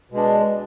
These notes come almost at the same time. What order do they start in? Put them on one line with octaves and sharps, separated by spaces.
B2 G#3 D4